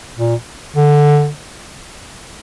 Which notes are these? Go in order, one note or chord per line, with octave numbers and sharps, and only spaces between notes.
A#2
D3